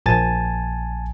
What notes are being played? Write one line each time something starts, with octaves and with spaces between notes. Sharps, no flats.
A#1 G#5 A5 A6